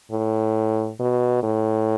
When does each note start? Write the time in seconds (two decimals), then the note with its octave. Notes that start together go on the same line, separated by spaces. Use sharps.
0.12 A2
1.00 B2
1.43 A2